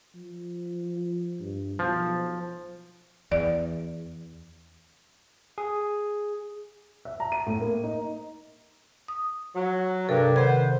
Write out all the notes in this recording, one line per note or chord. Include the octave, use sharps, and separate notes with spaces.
F3
G2
B1 F3
E2 D5
G#4
E5
A#5
D#7
A2
A#3
D#4
D#6
F#3
G2 C3 A4 A#4
D#3 B4 C5 F#5 G#6